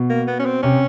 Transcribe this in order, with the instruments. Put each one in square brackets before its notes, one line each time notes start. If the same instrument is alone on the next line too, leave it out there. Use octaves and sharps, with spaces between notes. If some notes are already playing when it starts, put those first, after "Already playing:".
Already playing: [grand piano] B2
[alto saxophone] A#3
B3
C#4
C4
[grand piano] C3 [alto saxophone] C#4